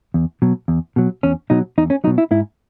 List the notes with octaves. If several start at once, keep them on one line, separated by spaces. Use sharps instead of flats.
E2
B2 F#3
E2
B2 F#3
E2 C#4
B2 F#3 D#4
E2 D#4
C#4
B2 F#3 D#4
E4
G#2 E4